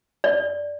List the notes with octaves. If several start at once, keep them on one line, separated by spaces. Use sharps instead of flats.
D5